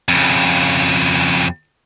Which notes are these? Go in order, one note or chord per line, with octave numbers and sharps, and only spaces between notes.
F2 C#3